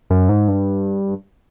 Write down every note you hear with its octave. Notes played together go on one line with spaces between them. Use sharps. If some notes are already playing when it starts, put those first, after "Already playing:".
F#2
G#2
G2